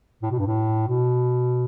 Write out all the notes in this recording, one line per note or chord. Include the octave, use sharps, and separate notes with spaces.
A2
B2
G2
A2
B2